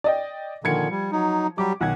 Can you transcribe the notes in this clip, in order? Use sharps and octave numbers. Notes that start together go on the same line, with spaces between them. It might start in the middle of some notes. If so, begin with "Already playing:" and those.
D5 D#5 G5
A#2 D3 D#3 F3 G#6 C#7
G3
F#3 D#4
F#3 G3 G4 D6
B1 D#3 F#5 G#6